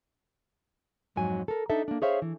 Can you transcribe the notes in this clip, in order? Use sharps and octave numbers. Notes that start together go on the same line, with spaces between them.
F2 G#2 F#3 G#5
A4 A#4
D4 D#4 A4 E5
A#3 D4
G#4 C5 C#5 E5 F5
E3